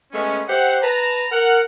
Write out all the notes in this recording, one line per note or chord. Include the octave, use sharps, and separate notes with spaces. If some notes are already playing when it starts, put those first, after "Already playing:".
G#3 A3 B3 C#4
G4 C5 E5 F#5
B4 A5 A#5
A#4 F#5